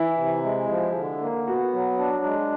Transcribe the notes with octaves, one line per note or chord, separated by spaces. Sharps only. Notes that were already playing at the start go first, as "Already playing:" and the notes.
Already playing: E3 E4
C3
G#3
F3
D3
A#3
B3 F#4
F#3
D4
G#3